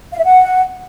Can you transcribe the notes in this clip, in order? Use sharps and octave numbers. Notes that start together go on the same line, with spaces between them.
F5
E5
F#5